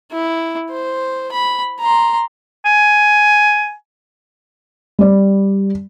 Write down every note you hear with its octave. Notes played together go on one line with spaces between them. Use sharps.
E4
C5
B5
A#5 C6
G#5
G3 D5